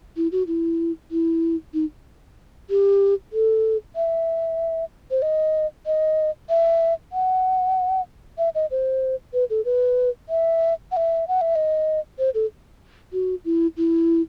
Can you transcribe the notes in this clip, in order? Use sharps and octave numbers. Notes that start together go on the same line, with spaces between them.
E4
F#4
E4
E4
D#4
G4
A4
E5
C5
D#5
D#5
E5
F#5
E5
D#5
C5
B4
A4
B4
E5
F#5
E5
F#5
E5
D#5
C5
A4
F#4
E4
E4